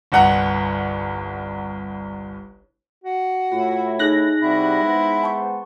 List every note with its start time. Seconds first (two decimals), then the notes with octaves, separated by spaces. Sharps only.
0.12 G1 C2 F#5 A#5
3.04 F#4
3.52 A2 E4 F4
3.99 D#4 G#4 F#6 A#6
4.41 C3 G3 E4 F#4
4.82 G#3 B3 C5
5.23 A5 C#6